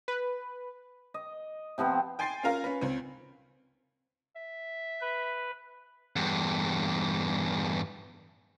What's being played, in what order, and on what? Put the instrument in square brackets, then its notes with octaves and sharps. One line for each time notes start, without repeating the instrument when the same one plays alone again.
[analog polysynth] B4
[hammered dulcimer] D#5
C3 F3 B3 C4
[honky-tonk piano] G5 G#5 C6 A6 C7
C#4 F4 A#4 F5
C#4 B4
C#2 C4
[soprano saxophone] E5
[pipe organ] B4
[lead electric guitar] E2 G2